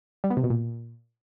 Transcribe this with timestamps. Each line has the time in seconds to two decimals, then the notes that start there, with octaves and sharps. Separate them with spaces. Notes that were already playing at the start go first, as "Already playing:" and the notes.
0.24 G3
0.30 B3
0.37 C3
0.44 B2
0.50 A#2